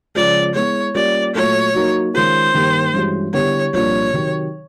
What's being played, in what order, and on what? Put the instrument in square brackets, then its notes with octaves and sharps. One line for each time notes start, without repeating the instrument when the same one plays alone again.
[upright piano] C#3 F3 G#3 [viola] D5
[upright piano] G#3 B3 E4 [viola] C#5
[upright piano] G3 A#3 C#4 F4 [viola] D5
[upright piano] A#2 F#3 A3 [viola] C#5
[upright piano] F#3 A#3 D#4 F#4
[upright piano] D#3 G#3 C#4 F4 A#4 [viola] C5
[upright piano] G2 D#3 G3 A#3
G2 E3 G#3 C#4 F#4
[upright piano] D3 G3 B3 E4 G4 [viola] C#5
[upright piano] C2 A#2 F3 A#3 D4 [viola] C#5
[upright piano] C3 D#3 F#3